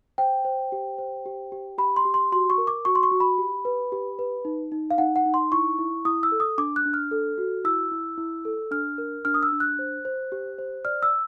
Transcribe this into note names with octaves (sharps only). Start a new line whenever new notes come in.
C5 G5
C5
G4
C5
G4
G4
G4 B5
C6
G4
C6
F#4 C6
C#6
A#4
D6
F#4 C#6
C6
C#6
F#4
B5
G4
B4
G4
B4
D#4
D#4
F5
D#4 F#5
F#5
D#4
C6
E4 C#6
E4
E4 D#6
E6
A4
D#6
D4 D6
F#6
D4
F6
A4
F#4
E4 E6
E4
E4
A4
D4 F6
A#4
D4 F6
D#6
E6
D4
F#6
C5
C5
G4
C5
D5 F6
E6